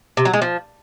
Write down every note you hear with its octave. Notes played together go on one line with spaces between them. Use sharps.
C3
F#3
G#3
F3